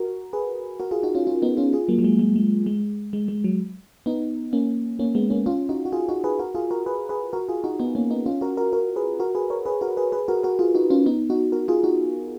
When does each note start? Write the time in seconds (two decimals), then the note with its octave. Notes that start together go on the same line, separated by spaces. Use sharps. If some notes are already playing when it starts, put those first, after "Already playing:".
Already playing: F#4 A#4
0.33 G#4 B4
0.80 F#4 A#4
0.91 F4 G#4
1.03 D#4 F#4
1.15 C#4 F4
1.27 C#4 F4
1.42 B3 D#4
1.57 C#4 F4
1.73 F4 G#4
1.88 F#3 A#3
1.99 F#3
2.04 G#3
2.19 G#3
2.36 G#3
2.66 G#3
3.13 G#3
3.28 G#3
3.44 F#3
4.06 B3 D#4
4.53 A#3 C#4
4.99 A#3 C#4
5.15 G#3 B3
5.30 A#3 C#4
5.46 C#4 F4
5.69 D#4 F#4
5.85 F#4
5.93 F4 G#4
6.09 D#4 F#4
6.24 G#4 B4
6.39 F#4 A#4
6.55 F4 G#4
6.71 F#4 A#4
6.86 G#4 B4
7.09 G#4 B4
7.33 F#4 A#4
7.49 F4 G#4
7.64 D#4 F#4
7.79 B3 D#4
7.95 A#3 C#4
8.11 B3 D#4
8.26 C#4 F4
8.41 F#4 A#4
8.57 F#4 A#4
8.73 F#4 A#4
8.96 G#4 B4
9.20 F#4 A#4
9.35 G#4 B4
9.50 A#4 C#5
9.66 G#4 B4
9.81 F#4 A#4
9.97 G#4 B4
10.12 G#4 B4
10.28 F#4 A#4
10.43 F#4 A#4
10.59 F4 G#4
10.75 D#4 F#4
10.90 C#4 F4
11.06 B3 D#4
11.30 D#4 F#4
11.52 F#4 A#4
11.68 F4 G#4
11.84 D#4 F#4